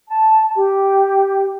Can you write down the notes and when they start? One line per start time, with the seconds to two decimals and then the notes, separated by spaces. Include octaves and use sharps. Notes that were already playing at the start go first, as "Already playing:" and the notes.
0.07 A5
0.54 G4